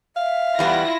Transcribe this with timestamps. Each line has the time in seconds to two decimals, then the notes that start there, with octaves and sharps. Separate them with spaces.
0.16 E5 F5
0.59 E2 G3 B3 E4 F4 A#6